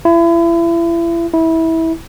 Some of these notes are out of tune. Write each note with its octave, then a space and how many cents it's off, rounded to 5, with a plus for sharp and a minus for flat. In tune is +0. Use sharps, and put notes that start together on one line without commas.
E4 +35
E4 -20